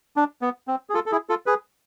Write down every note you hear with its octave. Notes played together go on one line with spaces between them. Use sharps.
D4
B3
C4
G#4
F4 A4
A4
E4 G#4
F4 A4
G#4 B4